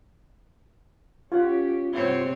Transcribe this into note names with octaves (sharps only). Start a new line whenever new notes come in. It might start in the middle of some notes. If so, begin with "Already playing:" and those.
C#4 F4 G4 C#5 F#5
G2 C3 G#3 C4 E4 F#4 C5 C#5